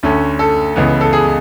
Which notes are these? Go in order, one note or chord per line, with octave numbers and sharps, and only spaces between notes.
D2 D3 A3 C#4
A4
C#2 C#3 E3 B3
A4
G#4